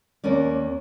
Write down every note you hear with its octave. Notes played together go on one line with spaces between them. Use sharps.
D#2 A#3 C#4 D5